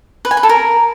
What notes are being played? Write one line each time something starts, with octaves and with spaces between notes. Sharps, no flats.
B4
G#5
B4
A4
A#4